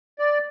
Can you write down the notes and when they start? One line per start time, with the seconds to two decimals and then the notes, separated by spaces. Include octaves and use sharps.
0.19 D5